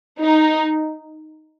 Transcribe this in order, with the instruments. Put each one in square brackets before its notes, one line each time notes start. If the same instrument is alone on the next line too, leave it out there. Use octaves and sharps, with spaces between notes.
[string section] D#4